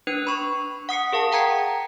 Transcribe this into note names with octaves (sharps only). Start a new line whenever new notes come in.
D4 B4 F#6
B5 C#6
F#5 D#6 C7 C#7
G#4 A#4 F5 A5
F#5 G5 A#5 G#6 C#7